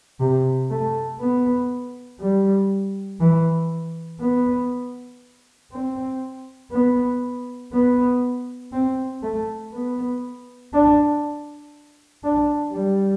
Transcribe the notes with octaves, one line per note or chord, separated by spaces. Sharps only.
C3
A3
B3
G3
E3
B3
C4
B3
B3
C4
A3
B3
D4
D4
G3